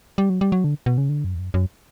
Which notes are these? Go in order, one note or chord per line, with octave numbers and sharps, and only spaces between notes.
G3
F#3
G3
F#3
D3
B2
C#3
D3
F#2
E2
F#2
F#2